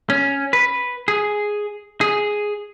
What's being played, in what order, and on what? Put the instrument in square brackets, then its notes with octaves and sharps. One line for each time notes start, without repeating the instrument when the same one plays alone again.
[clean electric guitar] C#4
B4
G#4
G#4